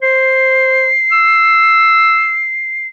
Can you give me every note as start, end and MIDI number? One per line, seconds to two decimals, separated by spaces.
0.02 0.90 72
0.02 2.87 96
1.12 2.42 88